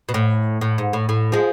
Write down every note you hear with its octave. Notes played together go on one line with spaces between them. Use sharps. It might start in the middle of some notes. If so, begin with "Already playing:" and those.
B2
A2
A2
G#2
A2
A2
F3 G#3